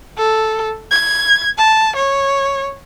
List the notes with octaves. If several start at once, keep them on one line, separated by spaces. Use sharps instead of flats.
A4
G#6
A5
C#5